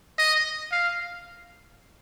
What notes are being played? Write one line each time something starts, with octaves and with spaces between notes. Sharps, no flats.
D#5
F5